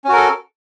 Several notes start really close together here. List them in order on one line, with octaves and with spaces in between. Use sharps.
C#4 F#4 A#4 A4